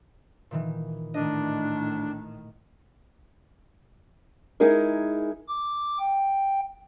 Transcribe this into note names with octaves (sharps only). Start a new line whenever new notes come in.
A#2 D#3 E3
A2 D#3 D4 D#5
G#3 D#4 E4 G#4 A#4
D6
G5